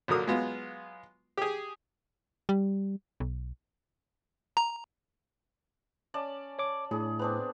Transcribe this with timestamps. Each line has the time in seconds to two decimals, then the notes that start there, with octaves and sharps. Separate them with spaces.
0.08 A#1 D3 F#3 A#4 D#6
0.27 F#3 G#3 B3 F4
1.37 G4 G#4
2.49 G3
3.20 B1
4.57 A#5
6.14 C#4 D5 A5
6.59 C#5 D6
6.91 A2 D4 G#4
7.19 B3 C4 D4